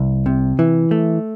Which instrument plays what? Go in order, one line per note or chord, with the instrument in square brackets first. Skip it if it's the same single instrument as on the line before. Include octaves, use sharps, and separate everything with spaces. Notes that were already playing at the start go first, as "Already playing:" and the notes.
Already playing: [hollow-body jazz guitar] C2
C3
E3
A3